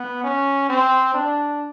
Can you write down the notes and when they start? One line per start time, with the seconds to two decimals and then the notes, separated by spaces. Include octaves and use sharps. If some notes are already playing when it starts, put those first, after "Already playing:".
Already playing: B3
0.24 C#4
0.69 C4
1.14 D4